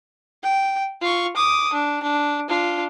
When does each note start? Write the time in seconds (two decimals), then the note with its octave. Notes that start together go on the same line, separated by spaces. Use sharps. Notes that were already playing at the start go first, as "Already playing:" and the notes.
0.43 G5
1.02 F4 C#6
1.36 D6 D#6
1.73 D4
2.03 D4
2.48 D4 F4